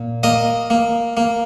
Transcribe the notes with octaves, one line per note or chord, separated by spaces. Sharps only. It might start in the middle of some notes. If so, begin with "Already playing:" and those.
Already playing: A#2
A#3 D#5
A#3
A#3